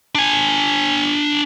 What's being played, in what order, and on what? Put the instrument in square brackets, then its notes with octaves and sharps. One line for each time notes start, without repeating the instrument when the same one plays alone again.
[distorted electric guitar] D4 G#5